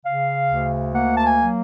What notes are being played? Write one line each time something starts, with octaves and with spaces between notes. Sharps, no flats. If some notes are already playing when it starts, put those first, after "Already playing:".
C#3 F5
D2
A#3 F#5
A5
G#5
F#3